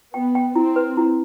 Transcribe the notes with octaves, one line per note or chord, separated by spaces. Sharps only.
B3 G5
G5
C4 E4
B4
E4